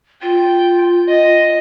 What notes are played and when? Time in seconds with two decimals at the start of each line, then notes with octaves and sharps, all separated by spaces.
0.22 F4 G5
1.09 D#5